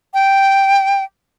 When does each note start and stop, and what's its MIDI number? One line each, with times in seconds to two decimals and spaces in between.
0.14 1.04 79